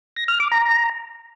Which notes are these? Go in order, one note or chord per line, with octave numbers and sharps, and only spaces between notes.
A#6
F6
D6
A#5